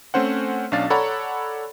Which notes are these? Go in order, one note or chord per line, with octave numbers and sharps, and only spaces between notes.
A3 C4 C#4 C5 F#5
B1 C#4 D4 F5 A6
A4 C#5 D5 F#5 A#5 B5